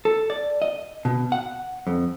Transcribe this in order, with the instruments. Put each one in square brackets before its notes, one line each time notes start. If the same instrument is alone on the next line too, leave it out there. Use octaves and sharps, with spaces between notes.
[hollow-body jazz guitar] A4
D5
D#5
B2
F#5
F2